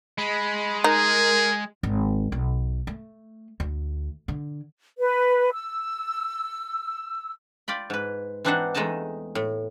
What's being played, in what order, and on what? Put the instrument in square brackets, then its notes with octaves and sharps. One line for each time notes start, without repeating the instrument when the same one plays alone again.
[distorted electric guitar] G#3 [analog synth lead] B5
[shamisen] D#4 [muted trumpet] G#4 [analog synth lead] A#4
[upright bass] G#1
B1
A3
D2
D3
[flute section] B4
E6
[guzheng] F4 D5 G5 B5
G#2 B4
E3 C4 D4 D#4 C5 F#5
E2 G#3 A3 D#4 D#5 A5
A2